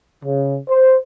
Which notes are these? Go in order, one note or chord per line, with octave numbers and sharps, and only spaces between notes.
C#3
C5